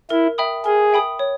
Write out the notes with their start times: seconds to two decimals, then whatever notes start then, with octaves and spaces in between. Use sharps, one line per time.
0.10 E4 A#4
0.38 E5 G5 B5 D#6
0.65 G#4 A#4
0.93 E5 G5 B5 D#6
1.19 C#5